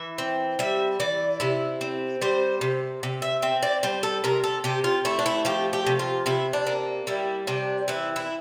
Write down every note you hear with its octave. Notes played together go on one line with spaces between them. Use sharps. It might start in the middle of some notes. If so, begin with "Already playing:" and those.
Already playing: E3 E5
C4
G3 E5
E3 D5
C3 E4
C4
G3 C5
C3
C3
E5
C4 E5
D5
G3 C5
A4
C3 A#4
A4
C3 G4
F4
A3 E4
D4
E4
F3 G4
G4
C3
F4
C3 E4
D4
A#3
G3 E4
C3 D4
E3 E4
E4